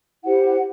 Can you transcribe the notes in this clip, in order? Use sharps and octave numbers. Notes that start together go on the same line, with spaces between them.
E4 G4 C5 F#5